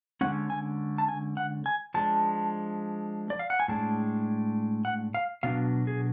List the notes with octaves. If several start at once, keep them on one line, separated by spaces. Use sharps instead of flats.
D3 G#3 C#4 F#5
G#5
A5
G#5
F#5
G#5
F3 G#3 D4 A5
D5
F5
F#5
G#5
A2 G#3 D4 A5
F#5
F5
B2 F#3 B3 D4 F5
G#4